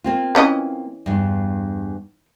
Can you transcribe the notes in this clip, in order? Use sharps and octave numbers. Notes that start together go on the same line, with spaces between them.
A#3 C4 F4
E3 C#4 D#5
E2 G2